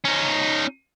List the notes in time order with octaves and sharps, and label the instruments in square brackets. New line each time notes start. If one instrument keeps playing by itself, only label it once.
[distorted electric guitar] C#4 D#4